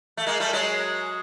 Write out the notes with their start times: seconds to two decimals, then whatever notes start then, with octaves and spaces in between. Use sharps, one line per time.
0.17 A3
0.27 G#3 A#3
0.40 G3 A3
0.53 F#3 G#3